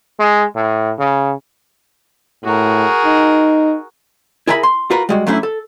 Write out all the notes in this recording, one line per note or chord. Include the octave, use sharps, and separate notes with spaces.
G#3
A2
C#3
A2 F#4 G#4 A#4
D#4
E4 G#4 A#4 E5 G#5 B5
C6
F4 F#4 A#4 B4
G3 G#3 F#4
F#3 A3 C#4 D4 E4
A4